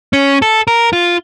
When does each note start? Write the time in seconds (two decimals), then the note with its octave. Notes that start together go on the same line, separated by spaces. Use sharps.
0.13 C#4
0.42 A4
0.67 A#4
0.93 F4